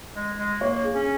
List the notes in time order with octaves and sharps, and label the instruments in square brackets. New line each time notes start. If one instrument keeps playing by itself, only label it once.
[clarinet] G#3
G#3
[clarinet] A#3 [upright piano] C#5
[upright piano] G#4
[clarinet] C#4